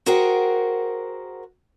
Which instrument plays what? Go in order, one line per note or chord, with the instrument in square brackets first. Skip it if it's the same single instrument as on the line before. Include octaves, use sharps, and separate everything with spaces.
[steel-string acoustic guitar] F#4 G#4 A#4 C5 F#5 G5